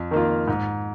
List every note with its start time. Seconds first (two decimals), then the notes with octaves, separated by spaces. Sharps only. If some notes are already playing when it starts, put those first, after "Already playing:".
Already playing: F2
0.11 D#3 A#3 F4
0.47 G#2